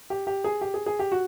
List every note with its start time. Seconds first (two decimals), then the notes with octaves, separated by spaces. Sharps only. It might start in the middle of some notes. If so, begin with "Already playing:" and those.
0.10 G4
0.27 G4
0.44 G#4
0.61 G4
0.74 G#4
0.86 G#4
0.99 G4
1.12 F#4